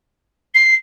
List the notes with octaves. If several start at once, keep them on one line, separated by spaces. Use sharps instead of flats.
C7